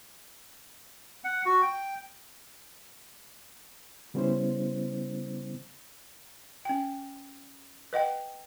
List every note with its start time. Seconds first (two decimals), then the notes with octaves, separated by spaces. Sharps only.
1.24 F#5
1.46 F#4
1.62 G5
4.14 C#3 G3 B3 C#4 E4 C5
6.65 C#4 G5
7.93 B4 D#5 F#5 G5